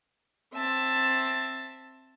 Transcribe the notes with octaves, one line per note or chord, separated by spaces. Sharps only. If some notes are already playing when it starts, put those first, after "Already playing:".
C4 E5 A5